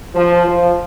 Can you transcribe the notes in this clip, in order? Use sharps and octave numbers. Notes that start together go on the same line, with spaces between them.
F3
F3